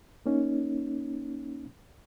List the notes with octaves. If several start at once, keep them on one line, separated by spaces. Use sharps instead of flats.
A#3 C#4 D#4